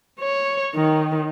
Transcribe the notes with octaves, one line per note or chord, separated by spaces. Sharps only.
C#5
D#3